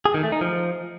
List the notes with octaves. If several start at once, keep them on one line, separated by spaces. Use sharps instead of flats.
G#4
D#3
A3
D#4
F3